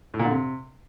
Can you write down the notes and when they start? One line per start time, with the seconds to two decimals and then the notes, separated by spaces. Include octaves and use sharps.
0.14 A2
0.19 A#2
0.25 D3
0.31 C3